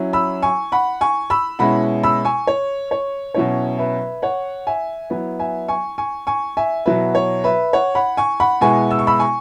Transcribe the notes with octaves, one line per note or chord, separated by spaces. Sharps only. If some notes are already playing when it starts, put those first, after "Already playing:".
Already playing: F#3 C#4 E4
B5 E6
G#5 C#6
F#5 B5
G#5 C#6
B5 E6
B2 G#3 C#4 E4 F#5 B5
B5 E6
G#5 C#6
C#5
C#5
B2 F#3 C#4 E4 C#5
B4 E5
C#5 F#5
E5 G#5
F#3 B3 E4
E5 G#5
G#5 C#6
G#5 C#6
G#5 C#6
E5 G#5
B2 F#3 E4 B4 E5
C#5
B4 E5
C#5 F#5
F#5 B5
G#5 C#6
F#5 B5
B2 G#3 B3 E4 G#5 C#6
E6
C#6
B5 E6
G#5 C#6